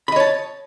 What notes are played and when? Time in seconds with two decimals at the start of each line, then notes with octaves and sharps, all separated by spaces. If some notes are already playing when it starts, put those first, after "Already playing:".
0.08 B5
0.12 D#5
0.16 C#5
0.20 A5